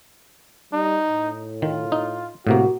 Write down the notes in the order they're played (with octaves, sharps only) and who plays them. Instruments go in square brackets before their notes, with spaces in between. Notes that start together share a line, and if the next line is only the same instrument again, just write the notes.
[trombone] G3 [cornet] D#4
[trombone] A2
[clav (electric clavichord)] D#3 [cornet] F4
[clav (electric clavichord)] D#4
[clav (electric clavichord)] A2 C3 A#3 [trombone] F#4